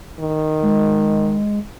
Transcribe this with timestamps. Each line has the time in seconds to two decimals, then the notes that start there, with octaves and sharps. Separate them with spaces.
0.20 D#3
0.62 G#3